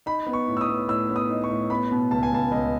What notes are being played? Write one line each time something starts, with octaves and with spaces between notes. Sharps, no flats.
D#4 B5
B3
C#6
A2
E6
D#6
B3
A2 E6
B3
D#6
D#4
C#6
A2
B3 B5
B2
C#2 A5
G#5
C#2 A5
C#2 D#5